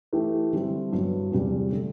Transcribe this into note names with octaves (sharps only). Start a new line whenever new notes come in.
E3 A3 E4 G4
D3 G3 C4 E4
G2 F#3 B3
E2 C3 G3
D3 A3